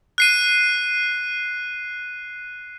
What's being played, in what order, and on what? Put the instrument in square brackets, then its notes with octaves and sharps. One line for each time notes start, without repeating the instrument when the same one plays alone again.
[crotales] F#6 C7 D#7